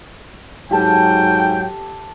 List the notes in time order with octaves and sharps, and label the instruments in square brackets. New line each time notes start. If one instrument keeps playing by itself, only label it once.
[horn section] G#2 F#3 G5 [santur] G4 A4 A5